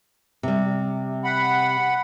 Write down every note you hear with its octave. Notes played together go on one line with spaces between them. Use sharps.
C3 G3
F#5 B5